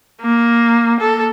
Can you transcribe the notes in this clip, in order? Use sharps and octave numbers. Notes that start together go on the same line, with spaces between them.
A#3
A4